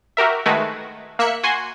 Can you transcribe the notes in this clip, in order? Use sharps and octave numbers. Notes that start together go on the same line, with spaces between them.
F#4 G4 A#4 E5
D#3 G#3 A3 F#4 B4
A#3 E5 F#6 C#7
F#4 G#5 C6